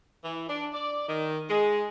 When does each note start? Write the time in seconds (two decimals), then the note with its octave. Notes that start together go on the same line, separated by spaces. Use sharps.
0.24 E3
0.48 D4
0.72 D5
1.07 D#3
1.48 G#3